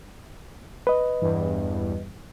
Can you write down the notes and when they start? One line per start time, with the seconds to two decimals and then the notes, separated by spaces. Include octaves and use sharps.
0.87 B4 D#5
1.21 E2 G2